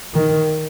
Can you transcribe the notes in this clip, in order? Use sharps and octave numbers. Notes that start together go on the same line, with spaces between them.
D#3